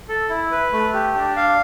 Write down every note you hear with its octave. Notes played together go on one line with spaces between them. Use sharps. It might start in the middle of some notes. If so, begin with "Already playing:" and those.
A4
E4
B4
A3
G4
D4
F5